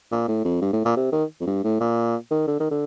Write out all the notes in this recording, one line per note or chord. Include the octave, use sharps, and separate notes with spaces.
A#2
A2
F2
G2
A2
A#2
C3
D#3
F2
G2
A2
A#2
D#3
D3
D#3
D3